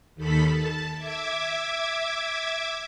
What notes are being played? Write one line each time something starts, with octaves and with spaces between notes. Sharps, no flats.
D#2 D#3 A4 B5 B6
A5
E5 D6 G#6